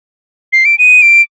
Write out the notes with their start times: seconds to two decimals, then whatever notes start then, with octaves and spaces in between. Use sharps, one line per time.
0.53 C7
0.65 D7
0.78 D#7
1.02 D7